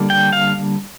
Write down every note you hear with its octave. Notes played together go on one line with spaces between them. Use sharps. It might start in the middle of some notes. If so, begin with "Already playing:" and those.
Already playing: D3 G3 A#3
G5
F5